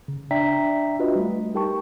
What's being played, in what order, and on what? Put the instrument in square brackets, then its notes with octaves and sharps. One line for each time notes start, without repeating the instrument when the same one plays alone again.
[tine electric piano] C#3
D4 D5 E5 G5 A#5 B6
D4 F4 F#4 B4 D#5
G3 A3
D#4 G4 A#4 G5 A5 C#6